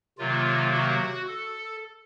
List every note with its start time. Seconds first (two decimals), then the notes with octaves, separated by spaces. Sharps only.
0.18 C3 D#3 F#3 A#3 F4
0.73 F#4
1.28 A4